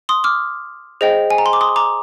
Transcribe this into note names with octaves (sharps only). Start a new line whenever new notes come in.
C6 D#6
D6 F6
G#4 C5 D#5 G5
G#5
A#5
C6
D6
C6 D#6
A#5 D6